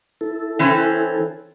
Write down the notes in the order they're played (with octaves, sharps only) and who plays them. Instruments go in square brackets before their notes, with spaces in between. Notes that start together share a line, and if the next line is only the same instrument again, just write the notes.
[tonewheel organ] E4 A4
[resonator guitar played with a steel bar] E3 C4 C#4